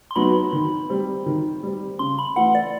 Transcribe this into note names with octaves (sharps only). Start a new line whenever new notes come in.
C6
F#3 B3 D#4 F#4 B5
D#3
G3 C4
D#3
G3 C4
C#3 C6
B5
E3 A3 F#5
D5